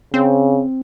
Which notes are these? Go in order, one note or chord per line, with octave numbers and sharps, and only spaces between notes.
C#3 C4